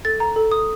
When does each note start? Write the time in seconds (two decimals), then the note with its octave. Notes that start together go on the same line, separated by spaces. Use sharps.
0.05 A4 A6
0.20 A#5
0.36 A4
0.52 D#6